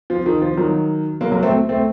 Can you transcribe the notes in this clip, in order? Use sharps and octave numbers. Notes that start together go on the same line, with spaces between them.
F3
D#3
F3
D#3 F#3
F#3 A#3
F#3 A#3
A3 C4
A3 C4